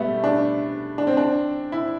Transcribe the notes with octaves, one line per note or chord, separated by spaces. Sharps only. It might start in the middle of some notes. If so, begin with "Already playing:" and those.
Already playing: G3 A3 B3 E5
D4
D4
C4
D4
E4